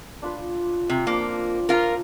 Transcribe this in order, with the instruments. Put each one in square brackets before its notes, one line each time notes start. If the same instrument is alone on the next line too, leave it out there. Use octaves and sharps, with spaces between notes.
[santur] D4 F4 B4
[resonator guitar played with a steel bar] C3
[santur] F3 C4 D4 [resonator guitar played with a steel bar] A#3
[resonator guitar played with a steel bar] F4 A#4